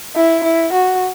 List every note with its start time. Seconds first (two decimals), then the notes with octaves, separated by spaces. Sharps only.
0.16 E4
0.44 E4
0.73 F#4